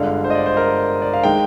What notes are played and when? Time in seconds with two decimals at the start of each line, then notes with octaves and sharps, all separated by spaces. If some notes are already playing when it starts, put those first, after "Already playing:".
Already playing: G1 G2 D3 G#3 F5
0.24 C5
0.30 D#5
0.35 D5
0.46 C5
0.57 A#4
1.02 D5
1.13 F5
1.24 D#3 G#3 G5